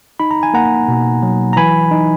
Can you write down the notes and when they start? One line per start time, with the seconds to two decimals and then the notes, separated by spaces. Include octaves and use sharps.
0.20 D#4 B5
0.31 A#5
0.43 G#5
0.54 A#3 F#5 A#5
0.88 B2
1.23 F#3
1.53 A#5
1.57 E3 G#5 B5
1.91 D#4